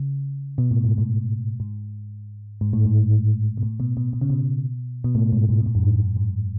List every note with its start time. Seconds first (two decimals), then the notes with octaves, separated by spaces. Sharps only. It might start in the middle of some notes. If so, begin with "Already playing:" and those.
Already playing: C#3
0.58 B2
0.71 A2
0.85 G#2
0.98 A2
1.60 G#2
2.61 G#2
2.73 A2
2.85 G#2
3.57 B2
3.63 A2
3.80 B2
3.97 B2
4.13 B2
4.21 C#3
4.30 B2
5.04 B2
5.15 A2
5.32 G#2
5.49 G#2
5.60 B2
5.66 A2
5.75 F#2
5.83 G#2
5.95 G#2
6.00 F#2
6.17 G#2